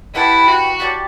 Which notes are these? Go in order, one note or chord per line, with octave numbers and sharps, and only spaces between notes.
E4 G4 B4 F#5 A5
F#4
G4 D5 F#5 A5